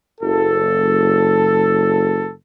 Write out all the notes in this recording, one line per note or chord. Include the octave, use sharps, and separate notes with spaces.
F#1 A4